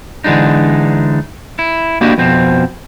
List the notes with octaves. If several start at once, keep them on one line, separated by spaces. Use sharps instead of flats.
D3 E3 G#3 D4 D#4
E4
A#3 D4 E4 F#4 G4 D#5
F2 B2 C4